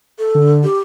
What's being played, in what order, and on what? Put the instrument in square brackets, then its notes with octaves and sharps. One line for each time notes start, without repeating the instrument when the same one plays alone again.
[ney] A4
[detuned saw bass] D3
[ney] G4